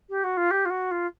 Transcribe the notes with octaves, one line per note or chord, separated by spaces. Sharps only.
G4
F#4
F4
G4
F4
F#4
F4